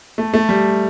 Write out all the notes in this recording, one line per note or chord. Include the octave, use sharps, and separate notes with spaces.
A3
A3
G3